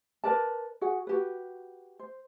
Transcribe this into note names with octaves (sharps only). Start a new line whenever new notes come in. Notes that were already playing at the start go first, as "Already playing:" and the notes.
A#4 B4 D5 A5
F#4 G#4 F#5
F#4 G4 B4
C5